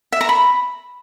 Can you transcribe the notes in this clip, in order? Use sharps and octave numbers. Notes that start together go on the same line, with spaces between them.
E5
A#5
B5